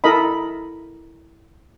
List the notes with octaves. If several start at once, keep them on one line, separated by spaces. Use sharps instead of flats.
E4 A4 A#4 D#5 B5